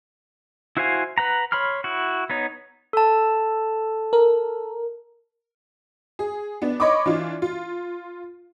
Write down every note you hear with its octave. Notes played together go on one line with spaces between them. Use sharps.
E4 F#4 C5 F5 G#5
B4 F#5 A#5
C#5 B5 C6 F6
E4 F#4
B3 D#4 C#5
A4 A5
A#4
G#4
B3 D4
C#5 D#5 B5 C#6 D6
E3 D4 F4
F4